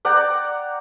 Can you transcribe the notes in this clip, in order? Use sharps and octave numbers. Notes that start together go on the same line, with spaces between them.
D5 F#5 G5 A#5